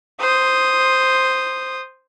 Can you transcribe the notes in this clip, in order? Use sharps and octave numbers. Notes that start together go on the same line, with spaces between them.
C5 D#6